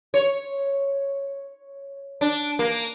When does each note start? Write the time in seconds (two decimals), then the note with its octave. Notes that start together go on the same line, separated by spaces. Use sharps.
0.14 C#5
2.21 D4
2.59 A#3